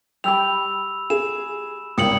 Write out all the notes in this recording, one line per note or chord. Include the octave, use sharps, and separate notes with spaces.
G3 G4 B5 E6 F7
G#4 E7
G#1 C#2 G3 D#6 C#7 F#7